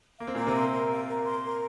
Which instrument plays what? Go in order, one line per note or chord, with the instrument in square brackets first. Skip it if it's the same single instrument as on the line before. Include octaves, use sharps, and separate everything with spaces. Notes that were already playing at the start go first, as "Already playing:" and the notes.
[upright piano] A#3 [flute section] F5
[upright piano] C4
[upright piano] A#2 A#3 [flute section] A#4
[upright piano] C3 C4
[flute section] C6
A#4
F5
A#4
C6
A#4